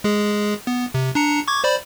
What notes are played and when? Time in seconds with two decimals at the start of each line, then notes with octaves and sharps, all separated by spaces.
0.04 G#3 G#4
0.67 B3
0.94 C3
1.15 D4 A#5 C#7
1.48 C#6 D6 G#6
1.64 C5 D5 B5